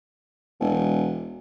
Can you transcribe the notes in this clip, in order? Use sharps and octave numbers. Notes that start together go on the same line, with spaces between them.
E1